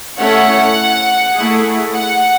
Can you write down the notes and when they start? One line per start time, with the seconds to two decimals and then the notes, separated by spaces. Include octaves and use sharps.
0.18 A3 C#4 E4 A4 C#5 F#5
1.34 A3 E4 G#4
1.94 F#5